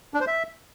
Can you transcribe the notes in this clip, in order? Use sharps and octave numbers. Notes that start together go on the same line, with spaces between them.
D4
C5
E5